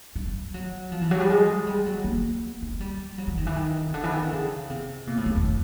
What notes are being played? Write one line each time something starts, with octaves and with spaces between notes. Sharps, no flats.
G3
F#3
F3
E3
F#3
G3
G#3
G3
F#3
A#3
G#3
G3
F#3
E3
D#3
E3
D#3
C#3
D3
E3
D#3
D3
C#3
C3
A#2
A2
E2
F2